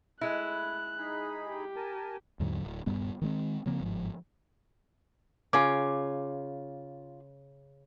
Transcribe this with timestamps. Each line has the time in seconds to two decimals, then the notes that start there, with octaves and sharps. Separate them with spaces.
0.21 G#3 A3 E4 F#6
0.98 D#4 G#4 B5
1.47 G4
1.76 A#4 G#5 A5
2.40 D#2 G#2 D3 F#3
2.64 D1
2.86 D#1 G2 G3 B3
3.22 D#3 G#3 C4
3.66 C#3 F3 A#3 C4
3.80 G1 G#2 F3
5.53 C#3 F4 G#5 D6